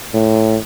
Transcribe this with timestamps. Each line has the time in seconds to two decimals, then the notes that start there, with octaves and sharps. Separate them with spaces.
0.14 A2